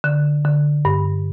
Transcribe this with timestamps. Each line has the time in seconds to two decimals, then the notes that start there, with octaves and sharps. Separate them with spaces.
0.04 D3
0.45 D3
0.85 G2